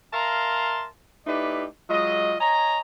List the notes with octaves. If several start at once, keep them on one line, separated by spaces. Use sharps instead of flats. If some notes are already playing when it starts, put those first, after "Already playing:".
A#4 E5 F5 A5 A#5 C6
A3 D#4 E4 G4 B4 D5
F#3 G#3 F4 D#5
C#5 D#5 G#5 A#5